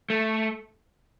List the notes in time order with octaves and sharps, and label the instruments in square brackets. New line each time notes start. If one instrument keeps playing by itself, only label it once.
[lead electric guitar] A3